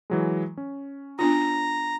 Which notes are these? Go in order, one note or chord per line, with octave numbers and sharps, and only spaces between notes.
E3 F#3 G#3
C#4
B3 D4 F4 A#5